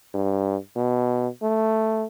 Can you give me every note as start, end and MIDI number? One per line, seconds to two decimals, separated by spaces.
0.14 0.57 43
0.76 1.29 47
1.43 2.06 57